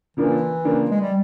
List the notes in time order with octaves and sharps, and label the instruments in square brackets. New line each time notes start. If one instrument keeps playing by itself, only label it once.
[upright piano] C#3 F3 A#3 D4 F4 [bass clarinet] E3
[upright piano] C#3 F3 A#3 D4 F4
[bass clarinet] G#3
G3